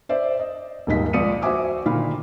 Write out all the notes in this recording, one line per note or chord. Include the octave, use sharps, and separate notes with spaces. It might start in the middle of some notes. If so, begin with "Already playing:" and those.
C5 D5 E5
D#5
D#1 D#2 G#2 D#5 B6
C#2 F3 D5 D#6 C#7 D#7
F#4 C5 E5 G#5 D6 D#6
A#2 D3 D#3 F5 B5